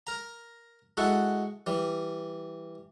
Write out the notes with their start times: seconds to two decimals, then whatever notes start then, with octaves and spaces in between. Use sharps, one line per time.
0.07 A#4 A#5
0.97 G#3 E4 F#4 A4 F#5
1.66 E3 G3